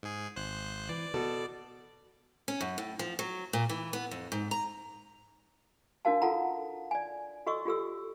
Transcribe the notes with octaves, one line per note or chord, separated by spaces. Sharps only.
G#2 G#4
G#1 C5 F#6
E3 D5
B2 A4
C#4
F#2
A2
F3
F#3
A#2
E3
B3
F2
G#2
A#5
D4 D#4 F#4 A#4 F5 A5
F4 A4 F#5 A5 A#5
D5 G#5
F#4 A4 D#5 C#6 E6
F4 G4 A4 E6